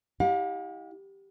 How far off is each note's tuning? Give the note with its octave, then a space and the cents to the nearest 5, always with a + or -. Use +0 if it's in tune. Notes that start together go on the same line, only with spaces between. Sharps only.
E4 -35 G4 +0 F5 +45